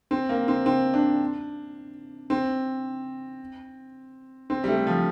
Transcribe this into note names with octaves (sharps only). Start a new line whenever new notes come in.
C4
A#3
C4
C4
D4
C4
C4
G3
A3
F3